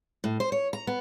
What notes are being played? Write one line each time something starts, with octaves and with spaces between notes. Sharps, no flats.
A2
C5
C#5
A#5
B3